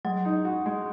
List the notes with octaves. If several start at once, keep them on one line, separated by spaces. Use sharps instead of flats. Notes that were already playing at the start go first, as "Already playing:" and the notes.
F#3 G#3
D#4
F#4
G#3